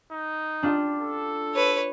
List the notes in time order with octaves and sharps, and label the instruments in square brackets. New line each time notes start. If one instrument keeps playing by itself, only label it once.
[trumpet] D#4
[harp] D4 F4 G4
[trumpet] A4
[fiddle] B4 C#5